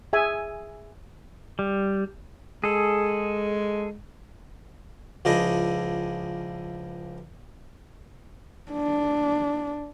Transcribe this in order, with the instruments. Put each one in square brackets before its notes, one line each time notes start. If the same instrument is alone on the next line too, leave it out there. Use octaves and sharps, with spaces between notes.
[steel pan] G#4 E5 G#5
[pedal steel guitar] G3
[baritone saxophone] G#3 [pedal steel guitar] G#4 A4
[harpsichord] C#2 F3 D4 E4 G#4 D#5
[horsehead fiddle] D4